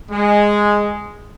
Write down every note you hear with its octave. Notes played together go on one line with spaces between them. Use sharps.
G#3